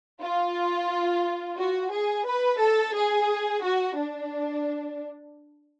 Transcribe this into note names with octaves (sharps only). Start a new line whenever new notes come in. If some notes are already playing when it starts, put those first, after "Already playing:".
F4
F#4
G#4
B4
A4
G#4
F#4
D4